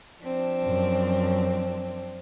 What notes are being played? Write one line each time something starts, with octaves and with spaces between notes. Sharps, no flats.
F3 C4 D4
F#2